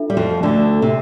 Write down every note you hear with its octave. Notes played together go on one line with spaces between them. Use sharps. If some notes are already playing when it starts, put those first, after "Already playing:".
Already playing: D4 F4 A4 E5
G3
F2 F3
D2 D3
C3